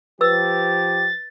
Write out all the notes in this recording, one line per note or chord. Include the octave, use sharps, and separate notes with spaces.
F3 G4 B4 E6 A6